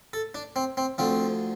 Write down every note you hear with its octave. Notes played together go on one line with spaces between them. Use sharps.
A4
D4
C4
C4
D2 D3 F3 C4